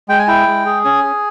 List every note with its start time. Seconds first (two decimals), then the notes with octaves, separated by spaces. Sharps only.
0.09 G#3 G5
0.19 G#5
0.28 E4 G5
0.47 G#3
0.66 G#4
0.85 C#4 G#5
1.03 G#4